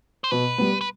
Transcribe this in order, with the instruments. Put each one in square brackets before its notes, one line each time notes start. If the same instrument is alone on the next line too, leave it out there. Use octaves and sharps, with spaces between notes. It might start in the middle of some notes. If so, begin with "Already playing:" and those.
[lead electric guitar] C5
[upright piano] B2 [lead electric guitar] B4
[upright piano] G3 B3
[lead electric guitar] B4